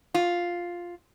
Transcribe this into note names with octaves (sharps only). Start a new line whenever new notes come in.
F4